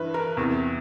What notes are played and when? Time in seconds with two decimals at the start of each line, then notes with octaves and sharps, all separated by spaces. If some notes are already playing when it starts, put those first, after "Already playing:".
Already playing: G2 E3 B4 E5
0.14 A#4
0.37 E2 C3 E3